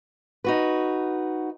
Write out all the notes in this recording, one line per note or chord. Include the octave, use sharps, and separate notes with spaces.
D#4 F#4 B4